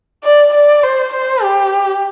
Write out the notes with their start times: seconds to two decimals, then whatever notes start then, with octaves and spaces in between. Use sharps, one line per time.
0.24 D5
0.54 D5
0.84 C5
1.14 C5
1.43 G4